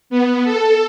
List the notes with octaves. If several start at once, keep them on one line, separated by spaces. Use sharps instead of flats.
B3
A4